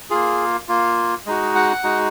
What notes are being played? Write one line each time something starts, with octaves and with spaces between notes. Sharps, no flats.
A#3 F4 G#4
A#3 F4
G#3 D#4 F#4
F#5
G#3 D#4 F#4